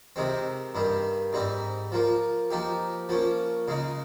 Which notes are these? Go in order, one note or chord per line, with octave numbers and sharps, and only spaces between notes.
C3 D#3 G#3 C4
G2 D#3 G3
G#2 G3 C4 D#4
F3 A#3 F4
F3 A#3 D#4 G4
F3 A#3 C#4
C#3 G#3 D#4